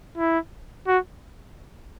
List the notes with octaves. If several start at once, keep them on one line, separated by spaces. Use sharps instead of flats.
E4
F#4